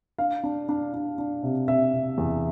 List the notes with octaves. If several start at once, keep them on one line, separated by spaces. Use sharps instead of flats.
D4 F5
D4
D4
D4
D4
C3
C3 E5
C3
E2